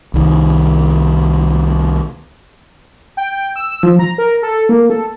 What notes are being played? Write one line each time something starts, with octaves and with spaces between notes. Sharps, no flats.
C2 D#3
G5
G5
E6
F3
A#5
A#4
A4
A#3
A4